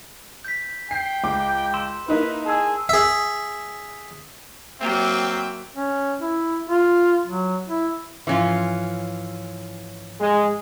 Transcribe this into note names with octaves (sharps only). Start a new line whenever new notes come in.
G6 B6
G5 C7
C#2 D6
C6 E6 E7
A#3 D#4 E4 B4
G#4 A5 E6
G#4 E5
F#3 A#3 C4 E5 G5
C#4
E4
F4
F#3
E4
G#2 E3 F3 C#4 F4 C6
G#3